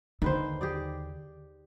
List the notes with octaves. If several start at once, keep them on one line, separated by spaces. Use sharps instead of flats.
D#2 D3 D#3 B4 C5
G4 G#4 D5